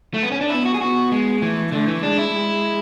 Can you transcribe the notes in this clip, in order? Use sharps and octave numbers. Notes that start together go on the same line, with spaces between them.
A3
B3
C#4
D4
B3 E4
F#4
G#4
B3 F#4
G#3
E3 A3
D3 A3
E3
G#3 D4
E4
G#3